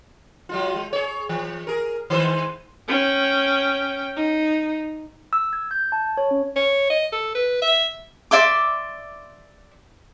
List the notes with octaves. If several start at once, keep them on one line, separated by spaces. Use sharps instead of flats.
F#3 G#3 F4
G#3
G#4 C#5
E3
G#4 A#4
D#3 G#3 C5
C#4 G5
D#4
E6
G#6
G6
A5
C#5
C#4
C#5
D#5
A4
B4
E5
D5 E5 C6 D6